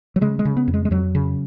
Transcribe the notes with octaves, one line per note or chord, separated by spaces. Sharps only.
F#3
C#3 G#3
G#3
C#3
B3
F2
G#3
G#3
F2 F#3
C#3